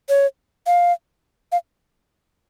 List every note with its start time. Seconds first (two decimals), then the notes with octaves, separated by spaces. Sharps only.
0.09 C#5
0.67 F5
1.52 F5